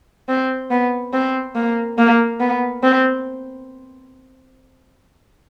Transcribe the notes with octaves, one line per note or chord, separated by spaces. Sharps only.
C4
B3
C4
A#3
A#3
B3
C4